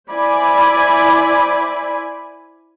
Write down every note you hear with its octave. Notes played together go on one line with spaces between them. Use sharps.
E4 C5 D5 G#5 B5